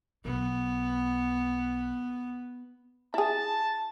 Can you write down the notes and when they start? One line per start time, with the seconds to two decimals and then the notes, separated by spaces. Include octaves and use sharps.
0.25 B1 B3
3.14 E4 G#4 A5